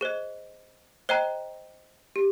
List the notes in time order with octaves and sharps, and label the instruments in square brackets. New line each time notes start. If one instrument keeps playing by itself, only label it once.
[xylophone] G#4 C5 D#5
C5 D#5 G5 A#5
G4